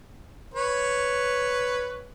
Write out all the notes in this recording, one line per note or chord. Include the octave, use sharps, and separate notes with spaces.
B4 C#5